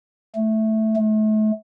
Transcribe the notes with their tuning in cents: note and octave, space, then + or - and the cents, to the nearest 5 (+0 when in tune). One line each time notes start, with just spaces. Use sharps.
A3 -5
A3 -35